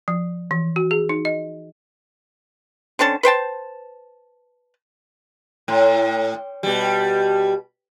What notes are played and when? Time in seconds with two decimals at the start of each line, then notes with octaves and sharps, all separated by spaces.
0.08 F3
0.51 E3
0.76 F#4
0.91 G#4
1.09 D#4
1.25 D#5
2.99 D3 C4 C#4 A5
3.23 B4 C5 G5 A5
5.68 A2
6.63 B2 G3